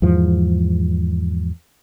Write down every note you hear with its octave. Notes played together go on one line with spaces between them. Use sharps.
E2 G#2 F3